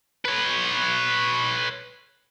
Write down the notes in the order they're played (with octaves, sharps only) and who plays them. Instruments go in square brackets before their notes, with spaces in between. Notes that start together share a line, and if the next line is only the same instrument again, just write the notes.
[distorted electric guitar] B4 C#5